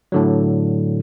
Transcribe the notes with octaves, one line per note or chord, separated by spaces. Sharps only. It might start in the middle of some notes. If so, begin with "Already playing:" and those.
A2 D3 F#3